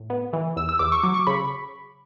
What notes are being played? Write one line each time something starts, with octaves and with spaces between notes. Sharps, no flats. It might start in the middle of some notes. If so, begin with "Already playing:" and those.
Already playing: A2
B3
E3
E2 E6
E6
E2 D6
C#6
F#3 D6
C#6
C#3 B5